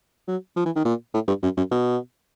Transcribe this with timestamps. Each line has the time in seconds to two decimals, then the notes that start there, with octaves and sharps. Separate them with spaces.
0.28 F#3
0.56 F3
0.66 E3
0.76 D#3
0.85 A#2
1.14 A2
1.28 G2
1.43 F#2
1.57 F#2
1.71 B2